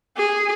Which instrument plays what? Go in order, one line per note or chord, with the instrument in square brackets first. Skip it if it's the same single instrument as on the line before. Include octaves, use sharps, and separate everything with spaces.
[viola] G#4